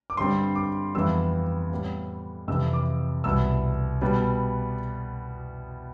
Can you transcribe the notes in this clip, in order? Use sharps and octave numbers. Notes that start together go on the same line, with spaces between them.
D6
G2 D3 G3 C4 C6
D6
F2 E3 G3 B3 E6
A2 G3 B3
F2 C3 E3 E6
D6
C2 B2 B3 E6
B2 G3 B3